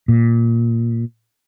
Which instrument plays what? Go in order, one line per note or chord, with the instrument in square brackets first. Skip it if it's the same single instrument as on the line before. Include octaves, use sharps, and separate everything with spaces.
[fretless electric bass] A#2